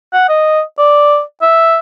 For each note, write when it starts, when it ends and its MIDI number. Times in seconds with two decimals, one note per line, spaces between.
0.13 0.27 78
0.29 0.61 75
0.78 1.21 74
1.42 1.79 76